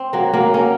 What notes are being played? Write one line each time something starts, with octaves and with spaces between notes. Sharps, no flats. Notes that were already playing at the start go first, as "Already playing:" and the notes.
Already playing: C4
F#3 A#3
F#3 A#3
A#3 C#4